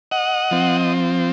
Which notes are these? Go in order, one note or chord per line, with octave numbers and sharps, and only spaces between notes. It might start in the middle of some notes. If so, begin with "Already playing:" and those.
D#5 F#5
F3 C4